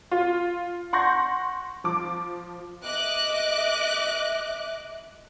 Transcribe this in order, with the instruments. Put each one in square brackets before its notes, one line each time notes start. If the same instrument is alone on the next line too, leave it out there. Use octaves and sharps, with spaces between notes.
[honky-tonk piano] F4
F#5 C6 C#6 G6 A#6
F3 D6
[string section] D#5 E5 D6 F#6